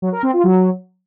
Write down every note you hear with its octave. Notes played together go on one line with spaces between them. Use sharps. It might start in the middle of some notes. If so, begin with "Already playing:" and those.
F#3
A#4
C4
F4
F#3